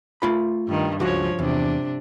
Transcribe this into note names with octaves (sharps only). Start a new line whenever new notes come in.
A3 F4 B5
G2 D#3
C#2 F3 F#4 C#5
E2 C3 D4